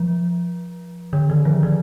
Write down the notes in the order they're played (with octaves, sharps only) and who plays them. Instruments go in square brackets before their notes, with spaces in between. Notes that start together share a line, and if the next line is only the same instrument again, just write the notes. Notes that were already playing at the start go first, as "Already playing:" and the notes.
Already playing: [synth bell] F3
D3
D#3
F3
D#3